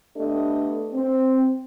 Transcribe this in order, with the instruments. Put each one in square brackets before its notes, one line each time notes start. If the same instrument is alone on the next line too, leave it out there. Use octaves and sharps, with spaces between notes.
[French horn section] A3 B3 D4 G4 A4 D#5
C4